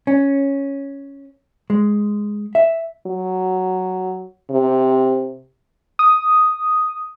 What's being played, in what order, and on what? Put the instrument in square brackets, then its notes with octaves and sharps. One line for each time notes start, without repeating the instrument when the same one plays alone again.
[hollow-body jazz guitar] C#4
G#3
E5
[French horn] F#3
C3
[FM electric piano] D#6